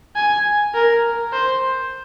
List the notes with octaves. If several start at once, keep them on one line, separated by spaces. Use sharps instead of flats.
G#5
A#4
C5